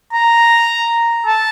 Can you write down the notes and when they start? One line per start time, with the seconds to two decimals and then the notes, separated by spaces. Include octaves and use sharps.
0.13 A#5
1.26 A5